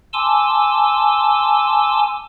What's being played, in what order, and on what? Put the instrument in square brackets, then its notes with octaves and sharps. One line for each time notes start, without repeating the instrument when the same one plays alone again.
[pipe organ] G#5 A5 C6 D6 E6